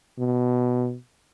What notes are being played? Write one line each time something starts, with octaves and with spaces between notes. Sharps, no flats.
B2